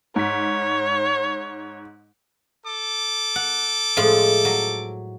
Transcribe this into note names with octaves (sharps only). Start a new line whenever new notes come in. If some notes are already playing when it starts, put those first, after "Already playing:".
G#2 C#5 B6
A4 D6
F#5
A2 F3 G#3
F#3